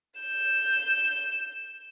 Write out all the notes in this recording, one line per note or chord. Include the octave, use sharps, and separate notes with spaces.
G6 E7